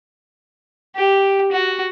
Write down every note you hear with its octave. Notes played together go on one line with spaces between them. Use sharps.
G4
F#4